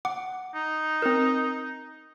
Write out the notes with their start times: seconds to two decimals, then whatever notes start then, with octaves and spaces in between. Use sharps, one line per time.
0.05 F#5 D6
0.55 D#4
1.02 C4 A#4